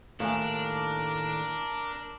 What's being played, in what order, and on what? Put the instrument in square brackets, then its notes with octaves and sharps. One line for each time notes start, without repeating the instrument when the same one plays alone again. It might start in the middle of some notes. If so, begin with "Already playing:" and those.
[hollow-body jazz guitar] D#2 A2 [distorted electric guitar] D4 [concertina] A#4 [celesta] F5 G#5